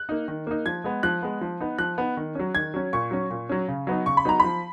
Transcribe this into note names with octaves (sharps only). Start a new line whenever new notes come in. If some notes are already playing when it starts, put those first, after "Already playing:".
Already playing: F#6
A#3 D#4
D#3
A#3 D#4
F3 G#6
G#3 B3
F3 F#6
G#3 B3
F3
B3 D#4
F3 F#6
B3 D#4
D#3
F#3 C#4
D#3 G#6
F#3 C#4
A#2 C#6
F#3 C#4
A#2
F#3 C#4
C#3
F#3 B3 D#4
C#3 C#6
B5
F#3 B3 D#4 A#5
F3 B5